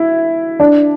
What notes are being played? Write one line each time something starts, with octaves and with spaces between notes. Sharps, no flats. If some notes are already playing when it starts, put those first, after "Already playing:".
Already playing: E4
D4